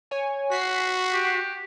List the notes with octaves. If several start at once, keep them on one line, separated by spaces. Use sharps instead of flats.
C#5 G#5
F#4 B6 C7
G4